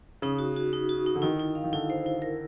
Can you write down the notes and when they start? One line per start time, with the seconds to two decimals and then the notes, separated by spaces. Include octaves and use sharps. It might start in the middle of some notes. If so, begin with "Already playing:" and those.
0.22 C#3 D#4
0.39 F#4
0.56 F#4
0.73 D#4
0.89 F#4
1.06 D#4
1.15 D3
1.22 D#3 E4
1.39 E4
1.55 F5
1.64 D#3
1.73 D3 E4
1.90 C5
2.06 E4
2.22 A#4